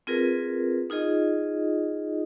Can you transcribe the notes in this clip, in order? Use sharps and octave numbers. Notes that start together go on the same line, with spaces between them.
C4 F4 G#4 A#4 B4
D#4 F4 G#4 D#5